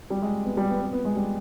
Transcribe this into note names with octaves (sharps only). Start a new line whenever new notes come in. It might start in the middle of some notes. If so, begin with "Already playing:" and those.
G3
G#3
B3
G3
B3
B3
B3
G#3
G3